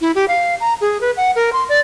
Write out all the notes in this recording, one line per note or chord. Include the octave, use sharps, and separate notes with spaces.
E4
G4
F5
A#5
G#4
B4
F#5
A#4
C6
D5